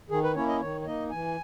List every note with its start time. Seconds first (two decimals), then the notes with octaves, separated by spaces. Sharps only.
0.10 D#3 G#4
0.23 B4
0.35 A#3 C#4 E4 C#5
0.48 D#5
0.60 D#3 C#5
0.81 C#5
0.86 A#3 D#4 D#5
1.10 E3 G#5